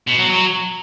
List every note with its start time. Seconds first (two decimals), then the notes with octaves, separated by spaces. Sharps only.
0.07 B2
0.18 F#3
0.29 F#3